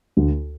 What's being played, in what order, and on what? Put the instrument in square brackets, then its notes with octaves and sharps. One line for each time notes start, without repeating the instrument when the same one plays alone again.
[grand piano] D2